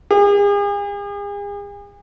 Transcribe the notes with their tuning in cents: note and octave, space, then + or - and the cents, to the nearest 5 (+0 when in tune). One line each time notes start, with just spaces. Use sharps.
G#4 -40